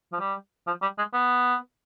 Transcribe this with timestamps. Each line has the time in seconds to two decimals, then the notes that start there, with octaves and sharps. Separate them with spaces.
0.12 F3
0.20 G3
0.67 F3
0.82 G3
0.98 G#3
1.13 B3